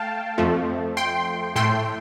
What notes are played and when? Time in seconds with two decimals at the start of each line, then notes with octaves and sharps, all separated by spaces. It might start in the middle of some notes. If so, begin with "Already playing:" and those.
Already playing: A3 F5 G5 A5
0.38 F2 F3 A3
0.97 G5 C6
1.56 A2 A3 G5 C6